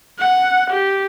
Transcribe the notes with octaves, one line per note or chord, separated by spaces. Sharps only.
F#5
G4